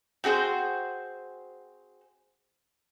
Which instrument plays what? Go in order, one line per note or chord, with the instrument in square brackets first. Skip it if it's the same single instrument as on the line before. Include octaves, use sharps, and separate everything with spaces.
[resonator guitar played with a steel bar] C4 F#4 G#4 C5